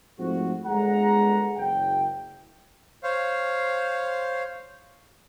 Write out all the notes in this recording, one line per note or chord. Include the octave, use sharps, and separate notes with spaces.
G#2 F3 A3 C4 F#4
G1 G#3 F#5 A#5
F#1 G5
C5 C#5 F5